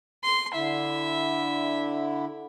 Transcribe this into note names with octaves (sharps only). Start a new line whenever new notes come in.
C6
D3 E4 E5